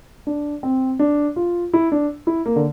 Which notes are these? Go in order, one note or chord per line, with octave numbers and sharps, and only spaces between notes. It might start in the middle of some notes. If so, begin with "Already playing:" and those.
D4
C4
D4
F4
E4
D4
E4
A#3
D3